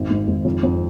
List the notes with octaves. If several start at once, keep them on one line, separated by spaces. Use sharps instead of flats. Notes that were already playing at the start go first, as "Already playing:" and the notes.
Already playing: G#1
G#2
G#1
F2
F2